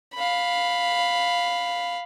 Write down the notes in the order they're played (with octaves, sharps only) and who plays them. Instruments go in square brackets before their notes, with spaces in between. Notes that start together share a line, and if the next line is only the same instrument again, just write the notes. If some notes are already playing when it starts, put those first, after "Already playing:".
[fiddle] F5 B5